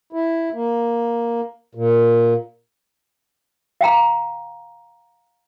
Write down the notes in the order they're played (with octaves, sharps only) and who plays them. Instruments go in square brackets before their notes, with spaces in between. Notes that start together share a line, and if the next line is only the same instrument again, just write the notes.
[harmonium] E4
A#3
A#2
[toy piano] F5 G5 A#5